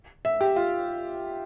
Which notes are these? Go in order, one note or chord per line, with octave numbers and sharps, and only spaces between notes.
E5
G4
F4